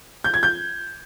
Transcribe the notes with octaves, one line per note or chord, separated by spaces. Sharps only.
G6
G#6
G6